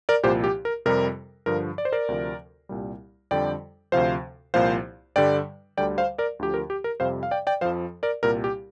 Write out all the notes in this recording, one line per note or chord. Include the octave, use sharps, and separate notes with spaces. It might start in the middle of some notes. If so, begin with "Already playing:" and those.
A#4 D5
C2 A#2 F3 G4 C5
G4
A#4
F2 C3 G3 A#4
G2 D3 F3 A#4
D5
C5
A#4 D5
D2 C3 F3
C2 A#2 G3
F2 D3 G3 D5 G5
D2 C3 F3 C5 F5
C2 A#2 F3 C5 F5
G2 D3 G3 D5 G5
D2 D3 G3 D5 G5
C5 F5
A#4 D5
D2 D3 F3 G4
A#4
G4
A#4
F2 C3 G3 C5 F5
F5
D5 G5
D5 G5
F2 F3 C5 F5
A#4 D5
C2 A#2 G3 A#4
G4